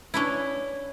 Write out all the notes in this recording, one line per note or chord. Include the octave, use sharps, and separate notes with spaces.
C#4 D4 E4